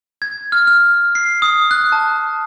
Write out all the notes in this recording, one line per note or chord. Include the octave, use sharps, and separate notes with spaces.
G#6
F6
F6
C7
D#6
F#6
A5